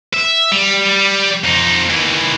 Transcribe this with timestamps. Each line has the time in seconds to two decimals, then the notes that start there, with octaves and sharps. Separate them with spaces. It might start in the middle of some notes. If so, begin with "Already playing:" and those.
0.14 E5
0.52 G3
1.44 F2 D#4
1.90 D#2 E3